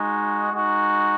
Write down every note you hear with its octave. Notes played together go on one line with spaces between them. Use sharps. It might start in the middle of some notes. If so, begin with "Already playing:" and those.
Already playing: G#3 D#4 F#4
G#3 D#4 F#4